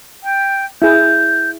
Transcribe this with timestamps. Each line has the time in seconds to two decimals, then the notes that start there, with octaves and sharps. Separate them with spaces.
0.23 G5
0.82 E4 G#4 G6